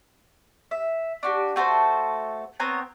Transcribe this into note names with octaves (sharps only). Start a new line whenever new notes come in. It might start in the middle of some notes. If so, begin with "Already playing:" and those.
E5
D4 F#4 G4
A3 F#4 A4 C5
B3 C4 C#5 A#5